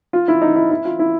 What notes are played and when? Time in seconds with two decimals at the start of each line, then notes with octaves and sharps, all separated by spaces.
0.13 F4
0.28 E4
0.42 D#4
0.56 E4
0.71 E4
0.85 F4
0.99 E4